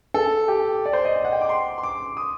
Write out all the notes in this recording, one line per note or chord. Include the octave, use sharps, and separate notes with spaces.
A4
G4
D5
C5
D#5
D#5
F#5
G5
D6
C6
C6
D6
D#6